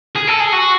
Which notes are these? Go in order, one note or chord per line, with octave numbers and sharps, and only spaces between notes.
G#4
A4
G#4
F#4